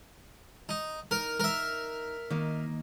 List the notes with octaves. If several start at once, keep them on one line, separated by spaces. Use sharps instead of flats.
D#4
D#4 A#4
A#4 E5
D#3 A#3 D#5